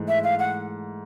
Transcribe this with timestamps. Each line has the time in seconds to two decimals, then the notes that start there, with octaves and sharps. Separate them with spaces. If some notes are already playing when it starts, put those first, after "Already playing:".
Already playing: G#2 E3 A3
0.08 E5
0.24 F5
0.39 F#5